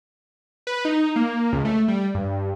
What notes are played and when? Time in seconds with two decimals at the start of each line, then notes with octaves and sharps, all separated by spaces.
0.67 B4
0.85 D#4
1.16 A#3
1.52 C#2
1.65 A3
1.88 G3
2.15 G2